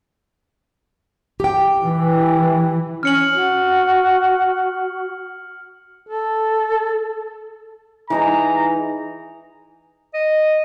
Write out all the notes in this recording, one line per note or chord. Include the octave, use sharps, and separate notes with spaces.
G4 G5
E3
C#4 F6 C#7 F#7
F#4
A4
E3 D#4 G#4 A#5
D#5